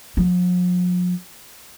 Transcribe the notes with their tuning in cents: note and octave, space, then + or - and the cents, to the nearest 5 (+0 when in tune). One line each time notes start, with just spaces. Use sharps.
F3 +45